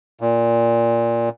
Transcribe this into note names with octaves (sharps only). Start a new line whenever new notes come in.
A#2